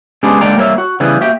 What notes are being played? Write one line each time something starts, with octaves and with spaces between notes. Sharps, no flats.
G#3 B3 C#4 D4 G4 G#4
D3 G#3 A#3 D5 G5 A#5
G3 A#3 A#4 C#5 E5
F#4
C#3 E3 G3 B3 G#4
A#3 F#4 G4 E5 G5